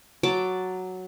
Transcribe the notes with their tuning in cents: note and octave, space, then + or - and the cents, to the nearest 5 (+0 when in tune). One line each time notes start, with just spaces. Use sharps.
F#3 +0 A5 +0 D6 +0